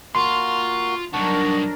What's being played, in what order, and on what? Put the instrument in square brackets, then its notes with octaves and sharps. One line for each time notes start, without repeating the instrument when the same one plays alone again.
[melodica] A#3 F#4 [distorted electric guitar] F4 [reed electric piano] C6
[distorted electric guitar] G2 D#3 [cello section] F#3 D4 A#4 [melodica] F#5 A5 C#6